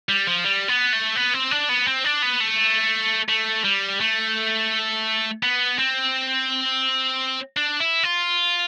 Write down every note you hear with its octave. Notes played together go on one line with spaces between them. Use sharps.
G3
F3
G3
B3
A3
B3
C4
D4
B3
C4
D4
B3
A3
A3
G3
A3
B3
C4
D4
E4
F4